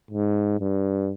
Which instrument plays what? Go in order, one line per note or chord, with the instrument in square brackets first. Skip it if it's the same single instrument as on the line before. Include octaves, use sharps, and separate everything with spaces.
[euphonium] G#2
G2